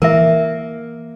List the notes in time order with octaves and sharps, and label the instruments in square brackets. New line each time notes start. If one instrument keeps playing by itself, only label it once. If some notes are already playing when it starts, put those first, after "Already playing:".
[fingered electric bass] E3 [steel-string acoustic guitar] A#3 [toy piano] A#4 E5